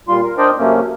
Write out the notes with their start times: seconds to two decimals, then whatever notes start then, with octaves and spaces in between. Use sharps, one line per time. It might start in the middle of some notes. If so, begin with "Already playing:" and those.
0.09 A#2 G3 F4 C6
0.23 A#4
0.38 D4 A#4 C5 D5 D#5 G5
0.58 F#2 C3 A3 A#3 C#4